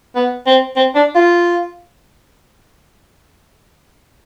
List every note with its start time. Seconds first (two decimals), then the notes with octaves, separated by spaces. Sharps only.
0.15 B3
0.46 C4
0.76 C4
0.95 D4
1.15 F4